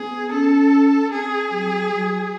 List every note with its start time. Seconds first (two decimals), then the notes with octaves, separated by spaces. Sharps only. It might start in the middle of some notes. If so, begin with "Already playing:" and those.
Already playing: B3 G#4
0.32 C#4 A4
1.12 C4 G#4
1.51 F#3
1.91 F#3